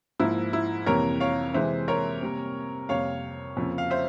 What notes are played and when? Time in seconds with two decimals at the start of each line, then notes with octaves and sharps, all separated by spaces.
0.19 G#2 F3 A#3 E4
0.53 E4
0.86 F2 C3 E3 G3 A#3 A#4 C#5
1.20 C#5 F5
1.54 C3 E3 G#3 C5 E5
1.88 A#4 C#5
2.22 C3 G3 A#3
2.89 F2 C3 G3 A#3 C#5 F5
3.57 F2 C#3 F3 A#3
3.78 F5
3.90 C5 E5